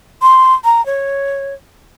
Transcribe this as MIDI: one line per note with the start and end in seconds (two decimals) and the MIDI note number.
0.22 0.54 84
0.64 0.84 82
0.86 1.54 73